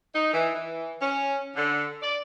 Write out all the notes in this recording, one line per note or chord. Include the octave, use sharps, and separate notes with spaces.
D#4
E3
E3
C#4
D3
D5